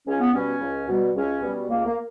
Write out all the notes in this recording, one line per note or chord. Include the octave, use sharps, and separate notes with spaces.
C#2 C#4
B3
B2 G3 C#4
C#2
B2 G3
C#2 C#4
B2 G3
C#2 A#3
A#3